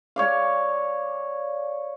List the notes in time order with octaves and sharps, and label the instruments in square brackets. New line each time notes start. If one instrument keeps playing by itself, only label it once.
[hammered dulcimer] C#5 D5 F5